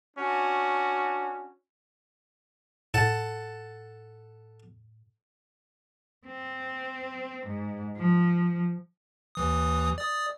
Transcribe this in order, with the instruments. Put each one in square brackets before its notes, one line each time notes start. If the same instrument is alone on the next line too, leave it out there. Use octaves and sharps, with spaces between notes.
[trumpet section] C#4 D4 F#4
[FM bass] A2 [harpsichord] A4 F#5 A5
[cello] C4
G#2
F3
[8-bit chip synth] D#2 E3 D#6
D5 D#6